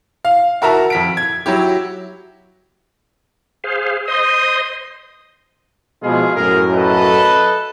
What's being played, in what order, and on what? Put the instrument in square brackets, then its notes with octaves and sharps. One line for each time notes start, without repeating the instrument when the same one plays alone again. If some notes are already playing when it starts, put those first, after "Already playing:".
[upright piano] F5
F#4 A#4 E5 A5 A#5
F2 B6 D7
G#6
F#3 E4 G4
[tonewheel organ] G#4 C5 F5
[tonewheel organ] C5 D#5 C6 [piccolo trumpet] D#6
[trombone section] B2 F3 G#3 [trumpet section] E4 F4 G#4
[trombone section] F#2 A2 [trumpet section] G#4 A#4
[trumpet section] A4 B4 D#5